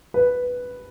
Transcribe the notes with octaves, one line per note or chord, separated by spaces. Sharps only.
B4